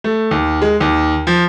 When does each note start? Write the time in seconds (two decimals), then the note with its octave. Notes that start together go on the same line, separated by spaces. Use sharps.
0.04 A3
0.31 D#2
0.62 G#3
0.80 D#2
1.27 F3